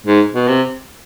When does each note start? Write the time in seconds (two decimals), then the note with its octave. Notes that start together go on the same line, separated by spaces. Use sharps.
0.07 G#2
0.34 B2
0.48 C3